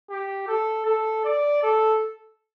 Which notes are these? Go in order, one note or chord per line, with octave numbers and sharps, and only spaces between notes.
G4
A4
A4
D5
A4